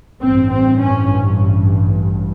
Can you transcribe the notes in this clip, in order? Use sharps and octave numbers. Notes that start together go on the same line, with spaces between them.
A1 G2 C4
C4
C#4